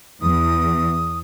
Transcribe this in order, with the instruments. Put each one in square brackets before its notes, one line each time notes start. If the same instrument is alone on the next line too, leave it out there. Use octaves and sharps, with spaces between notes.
[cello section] E2 [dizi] D#6